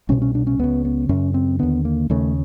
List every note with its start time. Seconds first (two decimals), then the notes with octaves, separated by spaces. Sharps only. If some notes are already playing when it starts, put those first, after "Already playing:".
0.09 C2 B2 C#4
0.22 C#4
0.35 D4
0.47 C#4
0.59 C#2 C#3 B3
0.85 B3
1.09 F#2 C#3 C#4
1.34 C4
1.59 D#2 D3 B3
1.85 A#3
2.10 D#2 C#3 A3